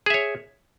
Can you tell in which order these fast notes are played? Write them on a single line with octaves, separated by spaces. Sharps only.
G#4 E5 C#5